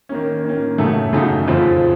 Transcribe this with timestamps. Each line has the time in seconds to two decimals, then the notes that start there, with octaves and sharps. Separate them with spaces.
0.09 D#3 A#3 C#4
0.45 D#3 A#3 C#4
0.78 F#2 C#3 A3 D#4 A4
1.13 F#2 C#3 A3 D#4 A4
1.47 F2 C#3 F3 C4 F4